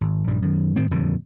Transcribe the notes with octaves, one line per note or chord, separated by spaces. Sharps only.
G#1
A#1 G2 G3
F#2 D#3
A2 D#3 C4
D#1 F2 D3 D#3